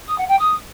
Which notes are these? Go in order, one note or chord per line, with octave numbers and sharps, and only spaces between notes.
D#6
F#5
G5
D#6